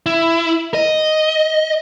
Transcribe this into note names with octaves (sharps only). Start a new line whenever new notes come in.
E4
D#5